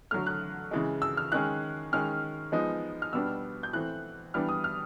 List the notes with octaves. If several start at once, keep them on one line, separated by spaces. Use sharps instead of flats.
D3 F#3 A3 F6
F#6
C#3 E3 G#3
E6
F6
D#3 G#3 C#4 F#6
D#3 G#3 C#4 F6
F3 G#3 B3 D#4
F6
B2 G3 B3 D4 E6
G6
E3 A3 C4 F#6
E3 G3 B3 D4 F6
D#6
F6